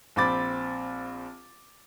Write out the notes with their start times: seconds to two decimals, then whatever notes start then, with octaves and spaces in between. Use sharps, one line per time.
0.16 A#1 C4 B5 D6 A6